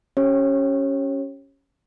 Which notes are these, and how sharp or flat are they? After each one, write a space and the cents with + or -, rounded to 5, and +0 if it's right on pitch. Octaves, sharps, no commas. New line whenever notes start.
C#4 +0 G4 -10 C#5 -30